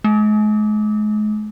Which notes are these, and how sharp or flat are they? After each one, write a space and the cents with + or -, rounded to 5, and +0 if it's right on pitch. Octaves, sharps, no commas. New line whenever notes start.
G#3 +40